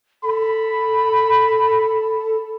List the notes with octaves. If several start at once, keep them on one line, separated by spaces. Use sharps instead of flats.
A4 B5